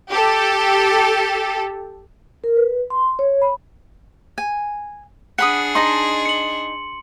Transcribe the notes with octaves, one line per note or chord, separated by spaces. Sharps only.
G4 A4
A#4
B4
C6
C#5
B5
G#5
D4 G#4 F#5 B5 D#6 C#7
D#4 D#5 A5 C6
C#7 F#7